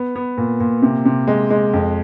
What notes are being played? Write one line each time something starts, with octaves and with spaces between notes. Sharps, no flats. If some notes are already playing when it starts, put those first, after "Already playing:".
Already playing: B3
B3
A#2
A#2
C3
C3
G#3
G#3
F2